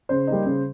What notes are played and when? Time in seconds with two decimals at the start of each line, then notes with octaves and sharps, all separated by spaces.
0.09 C#3 C5
0.27 G3 A#3 D#4
0.45 C#3